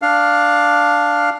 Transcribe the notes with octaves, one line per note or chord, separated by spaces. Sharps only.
D4 F5